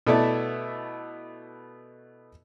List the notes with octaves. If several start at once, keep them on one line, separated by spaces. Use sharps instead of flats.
B2 A3 B3 E4 D5 A5